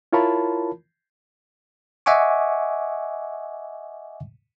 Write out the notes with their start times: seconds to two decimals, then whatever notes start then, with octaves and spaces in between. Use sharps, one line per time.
0.13 E4 F4 A#4 C#5 A5 B5
2.06 D#5 E5 F#5 G#5 C#6 D6